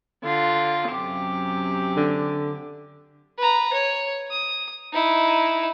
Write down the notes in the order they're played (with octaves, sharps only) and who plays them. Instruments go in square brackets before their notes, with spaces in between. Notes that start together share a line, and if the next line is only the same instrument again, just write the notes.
[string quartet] D3 F4
F#2 C3 G4
[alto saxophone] D3
[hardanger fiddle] B4 A#5
C#5
D#6
D#4 E4